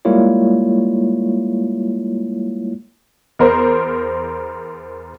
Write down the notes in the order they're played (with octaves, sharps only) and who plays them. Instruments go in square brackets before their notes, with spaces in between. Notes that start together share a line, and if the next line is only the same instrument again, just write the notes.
[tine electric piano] G3 G#3 A#3 E4 F4 C#5
[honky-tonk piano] E2 A#4 C5